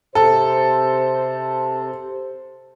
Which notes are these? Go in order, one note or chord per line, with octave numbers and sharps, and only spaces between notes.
C3 A4 C5